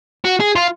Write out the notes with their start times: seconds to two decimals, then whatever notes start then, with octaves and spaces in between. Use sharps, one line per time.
0.24 F#4
0.40 G#4
0.55 F4